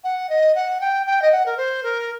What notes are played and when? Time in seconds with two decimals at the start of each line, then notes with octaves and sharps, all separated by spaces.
0.03 F#5
0.29 D#5
0.55 F#5
0.80 G5
1.06 G5
1.22 D#5
1.31 F#5
1.45 A#4
1.57 C5
1.83 A#4